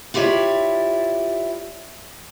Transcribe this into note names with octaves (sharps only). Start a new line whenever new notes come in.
E4 F4 G4 C#5 D5